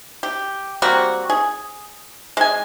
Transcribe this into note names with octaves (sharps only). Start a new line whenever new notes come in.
G4
G3 A#3 C4 F#4
G#4
G#3 G#5